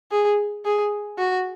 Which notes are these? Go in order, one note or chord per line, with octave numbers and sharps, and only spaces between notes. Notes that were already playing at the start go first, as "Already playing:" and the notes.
G#4
G#4
F#4